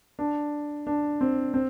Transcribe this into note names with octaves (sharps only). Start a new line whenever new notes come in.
D4
D4
C4
C4